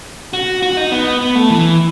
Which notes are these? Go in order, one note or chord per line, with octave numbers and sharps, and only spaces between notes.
F#4
F#4
D#4
B3
B3
A3
E3